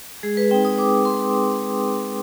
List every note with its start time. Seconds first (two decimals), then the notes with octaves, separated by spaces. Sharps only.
0.23 G#3 G#4
0.37 B4
0.51 C4 D#4 G5
0.65 D#6
0.78 G#3 D6
1.05 C4 D#4 C6